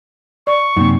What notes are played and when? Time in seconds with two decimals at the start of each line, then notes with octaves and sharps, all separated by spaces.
0.47 D5 C#6
0.77 F#2 C3 A#3 D#4